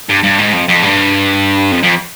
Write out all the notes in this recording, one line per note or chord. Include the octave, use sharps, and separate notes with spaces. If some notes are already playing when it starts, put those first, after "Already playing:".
G2
G2
G#2
F2
F2
G2
F2
F2